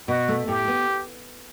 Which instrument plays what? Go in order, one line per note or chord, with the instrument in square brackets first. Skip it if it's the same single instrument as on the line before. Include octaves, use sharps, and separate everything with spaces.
[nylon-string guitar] B2 [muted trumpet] F#4
[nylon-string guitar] A3
[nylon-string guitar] A2 [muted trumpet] G4
[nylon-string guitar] B3